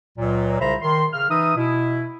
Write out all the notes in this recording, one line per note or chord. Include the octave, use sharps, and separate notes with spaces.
C#2 A#2 F#3
C2 C#3 C5 E5 A#5 B5
D#3 C6
C#3 F6
E3 D#4 E5 D#6
B2 E4